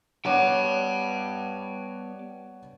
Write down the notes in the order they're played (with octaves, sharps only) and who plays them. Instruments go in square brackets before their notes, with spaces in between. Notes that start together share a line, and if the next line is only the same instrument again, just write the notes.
[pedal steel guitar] G3 B3 [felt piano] C#5 F#5 D6 [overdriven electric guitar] G5 A5